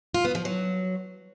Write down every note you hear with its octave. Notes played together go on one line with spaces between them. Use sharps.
F4
B3
F3
F#3